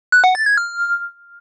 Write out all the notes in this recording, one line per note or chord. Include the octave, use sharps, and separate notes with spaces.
F#6
F#5
A6
G#6
F6